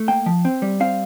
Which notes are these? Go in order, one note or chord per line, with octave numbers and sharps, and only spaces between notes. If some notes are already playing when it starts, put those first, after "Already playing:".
Already playing: A3
A#3 G5
F3
C4
G3
C4 F5